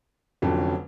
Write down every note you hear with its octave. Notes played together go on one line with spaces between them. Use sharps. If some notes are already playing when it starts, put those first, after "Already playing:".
F1 F2 D3 F#3 C#4